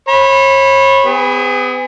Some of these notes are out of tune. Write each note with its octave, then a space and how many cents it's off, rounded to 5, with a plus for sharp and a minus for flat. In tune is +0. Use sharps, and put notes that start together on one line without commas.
C#5 -35 B5 +0
B3 +40 G#4 -30